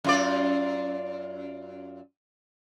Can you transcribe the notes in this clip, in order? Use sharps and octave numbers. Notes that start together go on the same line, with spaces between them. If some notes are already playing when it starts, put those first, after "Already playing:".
F#2 F4 D5